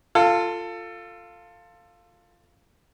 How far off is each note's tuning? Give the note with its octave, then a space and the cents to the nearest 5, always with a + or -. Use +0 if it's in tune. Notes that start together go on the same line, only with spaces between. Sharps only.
F4 +0 A4 +20